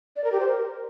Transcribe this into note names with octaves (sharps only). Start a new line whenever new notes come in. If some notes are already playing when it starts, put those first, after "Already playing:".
D5
A#4
G4
C5
A#4